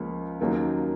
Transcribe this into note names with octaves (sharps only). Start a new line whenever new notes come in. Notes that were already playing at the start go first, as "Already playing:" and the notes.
Already playing: C#2 C#3 F3 A#3
D#2 C#3 F#3 A#3 D#4